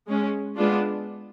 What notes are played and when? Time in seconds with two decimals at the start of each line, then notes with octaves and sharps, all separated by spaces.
0.08 G#3 C#4
0.57 G#3 B3 D4 F4